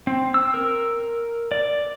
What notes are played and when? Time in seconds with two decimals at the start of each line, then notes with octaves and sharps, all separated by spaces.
0.07 C4
0.34 E6
0.54 A#4
1.52 D5